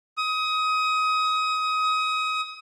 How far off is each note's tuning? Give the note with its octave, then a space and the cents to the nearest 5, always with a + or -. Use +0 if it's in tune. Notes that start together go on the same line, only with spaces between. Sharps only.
D#6 +25